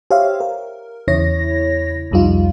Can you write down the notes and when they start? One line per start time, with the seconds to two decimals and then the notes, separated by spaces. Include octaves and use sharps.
0.11 G4 C5 C#5 E5 F5
0.40 A#4
1.08 E2 C#3 E4 C#5 A#6
2.11 C2 F2 G3 D#4 F4